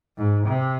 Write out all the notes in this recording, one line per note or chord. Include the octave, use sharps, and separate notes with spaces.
G#2
C3